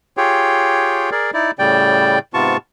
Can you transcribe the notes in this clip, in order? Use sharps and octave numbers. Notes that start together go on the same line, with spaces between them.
F4 G4 G#4 C#5 G5
G#4 A#4 D5
D#4 E4 D5
A2 C#3 G3 D5 G5
G#2 C3 B3 F4 A5 C#6